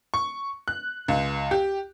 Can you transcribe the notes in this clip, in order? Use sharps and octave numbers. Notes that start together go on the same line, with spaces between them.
C#6
F#6
C#2
G4